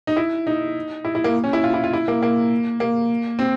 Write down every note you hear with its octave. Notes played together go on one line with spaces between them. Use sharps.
D#4
E4
D#4
E4
E4
A#3
C#4
E4
F4
E4
F4
E4
A#3
A#3
A#3
C4